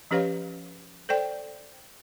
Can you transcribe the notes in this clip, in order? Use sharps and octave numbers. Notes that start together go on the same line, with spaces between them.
F3 C#4 G4 B4 C#5 F5
A4 C5 D5 G5